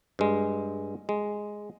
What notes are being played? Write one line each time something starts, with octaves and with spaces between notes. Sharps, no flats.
G2 G#3
G#3